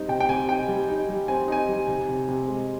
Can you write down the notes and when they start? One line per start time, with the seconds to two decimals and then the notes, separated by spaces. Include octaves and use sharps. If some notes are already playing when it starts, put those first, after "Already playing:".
Already playing: G3 C4 D#4
0.08 C3 G5
0.20 G5
0.29 C3 G#5
0.48 D#4 G5
0.68 G3
0.88 D#4
1.09 G3
1.28 C4 G#5
1.48 D#4 G#5
1.69 G3
1.88 C3
2.08 C3
2.28 C3
2.48 G#3